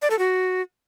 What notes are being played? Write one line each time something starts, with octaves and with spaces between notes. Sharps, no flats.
D5
A4
F#4